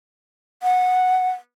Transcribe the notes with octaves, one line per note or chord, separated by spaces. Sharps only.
F#5